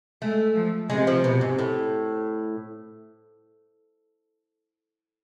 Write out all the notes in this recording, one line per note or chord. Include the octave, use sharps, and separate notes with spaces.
G#3 A3
F3
C3 G#3
F3
B2
G#2
A2